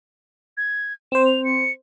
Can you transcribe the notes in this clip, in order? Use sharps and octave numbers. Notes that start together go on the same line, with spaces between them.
G#6
C4 C5 E7
F7
C#7